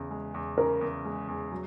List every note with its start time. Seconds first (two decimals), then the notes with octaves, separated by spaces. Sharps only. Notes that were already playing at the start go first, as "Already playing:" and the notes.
Already playing: E2 C#3
0.11 G#3
0.34 E2
0.57 C#3 A#4
0.81 E2
1.05 G#3
1.28 E2
1.52 F#3